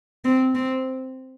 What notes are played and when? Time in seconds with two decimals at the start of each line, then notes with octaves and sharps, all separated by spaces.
0.25 C4
0.55 C4